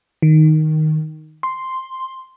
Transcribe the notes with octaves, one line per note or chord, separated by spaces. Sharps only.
D#3
C6